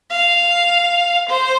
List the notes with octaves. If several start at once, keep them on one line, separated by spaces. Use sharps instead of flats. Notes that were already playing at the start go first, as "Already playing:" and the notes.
F5
C5